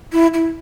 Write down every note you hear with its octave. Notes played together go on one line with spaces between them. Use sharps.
E4
E4